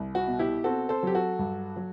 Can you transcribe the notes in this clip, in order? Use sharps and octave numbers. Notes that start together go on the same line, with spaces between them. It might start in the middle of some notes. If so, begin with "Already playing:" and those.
Already playing: C2
F#4
B2
E4 G4
C4 F#4 A4
A4 C5
F#3 G4
F#4 A4
G2
F#3